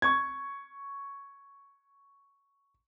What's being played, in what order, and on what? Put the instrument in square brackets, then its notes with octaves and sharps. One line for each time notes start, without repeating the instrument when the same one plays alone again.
[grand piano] C#6 G#6